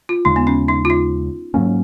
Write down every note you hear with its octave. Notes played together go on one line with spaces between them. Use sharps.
F4
D#2 C#3 G#3 D#4
B3
C#4
D#4
F4
D#4
G#2 F#3 A#3 C#4